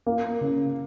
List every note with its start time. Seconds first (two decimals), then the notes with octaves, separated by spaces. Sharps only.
0.06 A#3
0.41 C#3